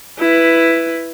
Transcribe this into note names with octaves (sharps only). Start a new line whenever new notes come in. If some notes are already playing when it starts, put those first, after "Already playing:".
E4 B4